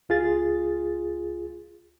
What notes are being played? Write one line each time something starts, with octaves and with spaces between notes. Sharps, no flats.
C#2 F4 G#4 A6